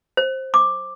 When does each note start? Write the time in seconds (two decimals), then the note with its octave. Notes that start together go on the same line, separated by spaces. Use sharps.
0.17 C5
0.54 D6